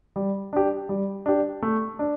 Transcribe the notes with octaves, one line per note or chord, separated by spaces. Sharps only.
G3
D4 G4
G3
D4 G4
A3
D4